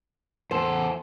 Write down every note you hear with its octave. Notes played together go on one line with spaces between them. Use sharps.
E2 A4 C5